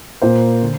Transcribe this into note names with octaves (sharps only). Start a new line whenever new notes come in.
A#2 A#3 C5
D3